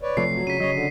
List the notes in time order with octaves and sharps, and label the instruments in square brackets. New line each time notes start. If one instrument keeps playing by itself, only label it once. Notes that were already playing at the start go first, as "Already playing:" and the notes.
[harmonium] B4 C#5 D5
[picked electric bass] C3 F3 A3 [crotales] C7
[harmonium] F#3
[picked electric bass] C#3 [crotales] B6 D#7
[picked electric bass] C#3 F#3 [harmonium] C#5 D#5
[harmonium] D3